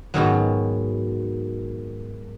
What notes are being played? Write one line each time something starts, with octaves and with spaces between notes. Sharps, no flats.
G#2 B2 D#3 F#3